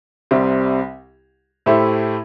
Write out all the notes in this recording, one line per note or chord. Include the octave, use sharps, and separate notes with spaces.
C2 C3 G3 C4
A2 A3 E4 G4 C5